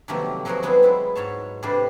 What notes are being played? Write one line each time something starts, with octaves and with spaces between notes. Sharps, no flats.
C3 D#3 F3 F#3 A3 A#3
F3 F#3 A3 F#4 G#4 A#4
F#3 G#3 B3 C4 D#4 G#4
B3 E4 F4
G#2 F#3 C#5 A5
A2 C3 G3 D4 B4 C5